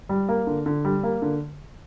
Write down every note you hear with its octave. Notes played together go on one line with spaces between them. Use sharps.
G3
A#3
D3
D3
G3
A#3
D3